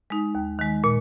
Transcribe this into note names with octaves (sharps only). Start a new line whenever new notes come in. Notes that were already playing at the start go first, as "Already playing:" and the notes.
G#3 D#4
D#2
D#3 G#3
A#2